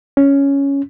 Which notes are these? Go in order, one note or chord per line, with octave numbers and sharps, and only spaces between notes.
C#4